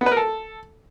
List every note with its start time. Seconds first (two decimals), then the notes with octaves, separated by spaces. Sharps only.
0.01 B3
0.06 B4
0.12 A#4
0.17 A4